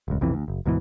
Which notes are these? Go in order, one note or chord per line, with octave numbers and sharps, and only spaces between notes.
D#1 C#2
B1 F2 C3 E3
D2
F#1
D2 G#2 B2 E3